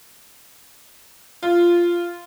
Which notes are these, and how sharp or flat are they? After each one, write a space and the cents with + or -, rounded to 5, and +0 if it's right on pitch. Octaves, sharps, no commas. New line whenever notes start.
F4 -10